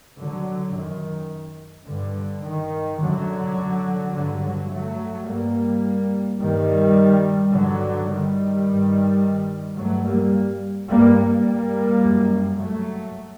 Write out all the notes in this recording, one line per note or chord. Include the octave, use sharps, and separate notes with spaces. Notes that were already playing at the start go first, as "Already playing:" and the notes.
D3 F#3
F#2 D#3
G2 D3
D#3
F#2 D3 F#3
G2 D3 F#3
D3 F#3
F#3 A3
G2 G3 A#3
G2 D#3 G3
G2 D3 F#3
D#3 G3
G2
G2 F#3 A3
G3 A#3
G2 G3 A#3
G3 A#3
F#2
F#3 A3